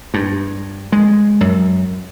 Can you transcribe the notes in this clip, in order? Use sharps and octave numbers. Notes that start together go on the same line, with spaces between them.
G2
G#3
F#2